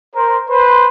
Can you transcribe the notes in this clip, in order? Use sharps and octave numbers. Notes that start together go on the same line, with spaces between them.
A#4 C5
B4 C5